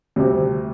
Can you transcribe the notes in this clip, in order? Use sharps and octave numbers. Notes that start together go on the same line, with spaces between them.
D2 C3 G3 C4 G4